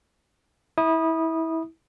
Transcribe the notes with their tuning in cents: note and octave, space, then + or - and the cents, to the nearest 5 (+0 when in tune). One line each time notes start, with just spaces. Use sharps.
E4 -25 D#6 -15